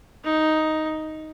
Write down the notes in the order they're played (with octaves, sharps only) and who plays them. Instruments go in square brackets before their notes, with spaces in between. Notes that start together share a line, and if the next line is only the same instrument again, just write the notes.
[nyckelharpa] D#4